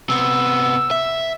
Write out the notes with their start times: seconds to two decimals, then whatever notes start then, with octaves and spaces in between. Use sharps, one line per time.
0.09 C3 B3 E6
0.91 E5